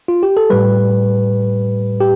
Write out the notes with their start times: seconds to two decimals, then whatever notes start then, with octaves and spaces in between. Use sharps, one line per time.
0.08 F4
0.23 G4
0.37 A4
0.50 A2 G3 B4
2.00 G4